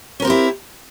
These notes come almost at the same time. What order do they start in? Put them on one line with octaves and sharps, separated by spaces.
C#4 A#4 C4 G4 E4